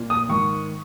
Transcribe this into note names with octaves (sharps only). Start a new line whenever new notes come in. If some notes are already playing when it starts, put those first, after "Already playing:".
Already playing: A#2
D#6
G#2 D#3 C#6